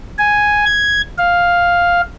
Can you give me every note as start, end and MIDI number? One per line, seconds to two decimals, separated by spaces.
0.19 0.65 80
0.66 1.01 92
1.18 2.01 77